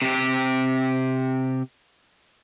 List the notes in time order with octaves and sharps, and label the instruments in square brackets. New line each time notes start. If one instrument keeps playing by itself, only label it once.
[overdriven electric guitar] C3 G4